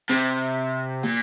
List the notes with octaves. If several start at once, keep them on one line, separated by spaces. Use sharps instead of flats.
C3
A#2